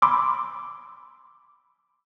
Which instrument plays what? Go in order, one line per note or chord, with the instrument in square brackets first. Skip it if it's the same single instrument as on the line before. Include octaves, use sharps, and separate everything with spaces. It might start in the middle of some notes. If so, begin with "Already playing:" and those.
[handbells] B5 C6 D6 E6